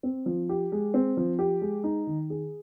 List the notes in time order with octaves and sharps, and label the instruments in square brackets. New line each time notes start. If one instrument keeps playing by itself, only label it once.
[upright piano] C4
F3
G4
G#3
C4
F3
G4
G#3
D#4
D#3
G#4